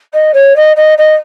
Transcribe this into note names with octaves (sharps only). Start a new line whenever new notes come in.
D#5
C#5
D#5
D#5
D#5